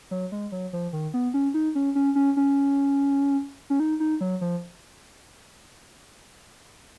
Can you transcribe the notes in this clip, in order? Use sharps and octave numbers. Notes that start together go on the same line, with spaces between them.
F#3
G#3
F#3
F3
D#3
B3
C#4
D#4
C#4
C#4
C#4
C#4
C#4
D#4
D#4
F#3
F3